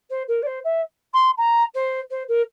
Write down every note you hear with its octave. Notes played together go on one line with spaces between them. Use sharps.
C5
A#4
D5
C5
E5
C6
A#5
C5
C5
A#4